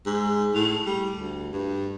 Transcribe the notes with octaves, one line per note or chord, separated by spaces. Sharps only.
G#2
A2
G3
D2
G2